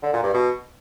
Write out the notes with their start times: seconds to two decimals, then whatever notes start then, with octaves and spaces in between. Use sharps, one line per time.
0.03 D3
0.13 A#2
0.23 G2
0.33 B2